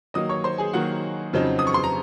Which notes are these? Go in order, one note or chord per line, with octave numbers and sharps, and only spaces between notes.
D#3 F#3 A#3 D#5 D#6
C#5 C#6
C5 C6
G#4 G#5
D#3 F#3 A#3 F#4 F#5
F2 C#3 F#3 C4 D#4
D#6
C#6
C6
A#5